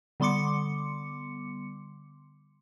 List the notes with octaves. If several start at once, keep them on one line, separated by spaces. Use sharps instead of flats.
D3 G3 B3 C6 D6 C#7